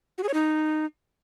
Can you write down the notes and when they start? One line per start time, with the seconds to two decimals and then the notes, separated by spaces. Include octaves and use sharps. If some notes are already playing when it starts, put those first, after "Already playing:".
0.18 F#4
0.23 G#4
0.29 C#5
0.34 D#4